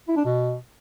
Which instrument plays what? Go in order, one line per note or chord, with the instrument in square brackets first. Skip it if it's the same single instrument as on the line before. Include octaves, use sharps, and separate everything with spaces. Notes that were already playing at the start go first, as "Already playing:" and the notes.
[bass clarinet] E4
D4
B2